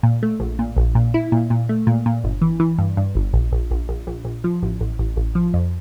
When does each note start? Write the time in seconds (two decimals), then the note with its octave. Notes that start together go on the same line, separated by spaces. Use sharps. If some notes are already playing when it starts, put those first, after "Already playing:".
0.03 A#2
0.23 A3
0.40 A#1
0.59 A#2
0.77 A#1
0.95 A#2
1.14 E4
1.32 A#2
1.50 A#2
1.69 A3
1.87 A#2
2.06 A#2
2.24 G1
2.42 E3
2.60 E3
2.78 G2
2.97 G2
3.15 G1
3.33 A#1
3.52 A#1
3.71 A#1
3.89 A#1
4.07 A#1
4.25 A#1
4.44 F3
4.62 A1
4.81 A1
4.99 A1
5.16 A1
5.35 F3
5.54 F2